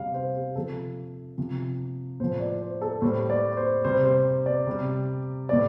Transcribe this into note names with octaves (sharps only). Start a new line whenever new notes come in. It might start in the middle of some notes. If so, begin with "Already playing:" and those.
Already playing: C3 G3 F5
C5
G4
C3 F3 A4
C3 F3
A2 F3 C5
D5
C5
A4
A2 G3 C5
D5
C5
C3 G3 C5
C5
D5
C3 G3
A2 G3 D5